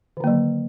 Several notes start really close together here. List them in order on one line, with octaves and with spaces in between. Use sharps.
D#3 D3 A#3 F#3